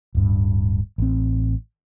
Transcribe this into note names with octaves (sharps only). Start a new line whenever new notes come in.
D1 G2
A1 C4